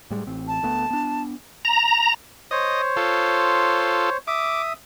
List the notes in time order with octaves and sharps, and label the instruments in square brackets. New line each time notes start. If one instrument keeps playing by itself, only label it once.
[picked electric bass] A2 G3 G#3
A1 C4
[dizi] A5
[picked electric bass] D2 A3 B3
B3 D4
[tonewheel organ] A#5
[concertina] C5 C#5 [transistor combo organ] D#5
[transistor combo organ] F4 A4
[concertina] E5 D#6 [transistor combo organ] D6